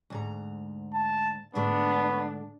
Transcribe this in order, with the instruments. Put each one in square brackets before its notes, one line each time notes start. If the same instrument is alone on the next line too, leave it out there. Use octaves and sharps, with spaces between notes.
[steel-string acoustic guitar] D2 G#2 A#5
[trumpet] A5
[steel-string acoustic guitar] G#2 D3 A3 [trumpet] B3 [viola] D4